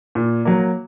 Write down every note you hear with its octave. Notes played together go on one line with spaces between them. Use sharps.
A#2
F#3 A#3